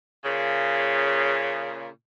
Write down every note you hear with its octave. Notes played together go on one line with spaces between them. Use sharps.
A#2 C#3